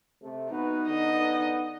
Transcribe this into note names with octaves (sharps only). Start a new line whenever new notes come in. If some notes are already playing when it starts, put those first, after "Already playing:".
C3 A3
B3 D#4 F#4 B4
D3 B3 D#5